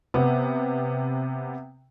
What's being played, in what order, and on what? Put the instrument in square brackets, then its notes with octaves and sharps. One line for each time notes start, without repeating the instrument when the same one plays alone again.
[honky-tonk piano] C3 B3